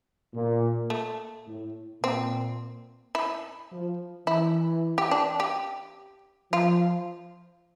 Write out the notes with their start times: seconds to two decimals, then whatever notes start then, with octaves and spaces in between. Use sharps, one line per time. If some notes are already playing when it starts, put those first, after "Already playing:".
0.34 A#2
0.90 A3
1.47 A2
2.03 A#2 C4
3.15 E4
3.72 F3
4.27 E3 E4
4.98 G4
5.11 D4
5.40 G4
6.52 F3 F4